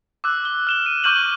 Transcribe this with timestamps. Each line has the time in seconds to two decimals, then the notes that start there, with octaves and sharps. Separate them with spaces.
0.24 D6 E6 F#6
0.45 G7
0.67 F6 E7 G7
0.86 D#7
1.04 C#6 D6 F6 G6 D#7 F#7